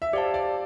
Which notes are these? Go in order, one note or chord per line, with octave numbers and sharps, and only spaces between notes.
E5
G4 C5 D5 F5 A5
D5